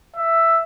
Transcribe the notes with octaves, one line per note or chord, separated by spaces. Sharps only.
E5